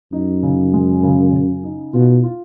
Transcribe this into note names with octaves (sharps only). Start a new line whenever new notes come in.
F#2 D#4
C#3
G#3
C#3
C#3
D#4
B2 F4
F4